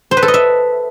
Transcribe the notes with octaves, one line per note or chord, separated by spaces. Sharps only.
C5
B4
A4
D#5
E5